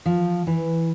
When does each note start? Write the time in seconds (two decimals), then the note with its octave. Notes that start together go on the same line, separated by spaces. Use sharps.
0.06 F3
0.47 E3